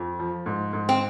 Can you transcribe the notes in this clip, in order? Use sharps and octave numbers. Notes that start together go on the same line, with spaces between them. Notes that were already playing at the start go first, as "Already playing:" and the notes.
Already playing: F2
F3
G#2
G#2
C4